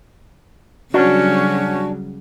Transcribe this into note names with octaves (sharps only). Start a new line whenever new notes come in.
C#3 F#3 G3 C#4 D4 F#4